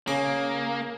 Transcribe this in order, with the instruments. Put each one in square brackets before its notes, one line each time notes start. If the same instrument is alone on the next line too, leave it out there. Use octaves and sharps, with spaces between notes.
[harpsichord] C#3 D6 [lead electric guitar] A#3